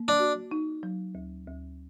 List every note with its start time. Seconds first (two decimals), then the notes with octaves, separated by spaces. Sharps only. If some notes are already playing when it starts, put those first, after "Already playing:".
Already playing: A#3
0.08 D4
0.20 F#4
0.51 D#4
0.83 F#3
1.15 D2
1.47 D2